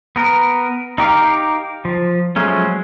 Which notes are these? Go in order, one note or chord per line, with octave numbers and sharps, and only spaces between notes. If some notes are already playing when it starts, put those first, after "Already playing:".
B3 A#4
D#4 G4 A#4 F5
F3
F3 F#3 G#3 A3 C#4